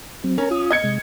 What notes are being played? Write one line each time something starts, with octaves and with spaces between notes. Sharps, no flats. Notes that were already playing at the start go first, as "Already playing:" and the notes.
F#3 C4
C#4 A#4 A#5
F4 D#6
D#5 G#6 C#7
C3 G#3